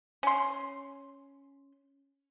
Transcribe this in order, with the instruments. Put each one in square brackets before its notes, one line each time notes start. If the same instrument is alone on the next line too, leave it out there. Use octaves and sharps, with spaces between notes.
[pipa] C#4 C6